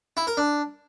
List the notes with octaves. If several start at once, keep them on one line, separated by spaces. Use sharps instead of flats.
E4
A#4
D4